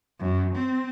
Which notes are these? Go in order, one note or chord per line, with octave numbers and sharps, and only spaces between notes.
F#2
C4